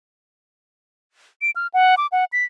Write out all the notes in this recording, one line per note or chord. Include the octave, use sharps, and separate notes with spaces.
D7
F6
F#5
D6
F#5
B6